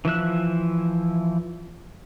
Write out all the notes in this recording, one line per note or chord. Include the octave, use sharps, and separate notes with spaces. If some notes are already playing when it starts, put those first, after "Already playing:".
E3 F3 E5 F#6